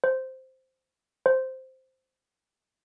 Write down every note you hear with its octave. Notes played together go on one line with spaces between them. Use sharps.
C5
C5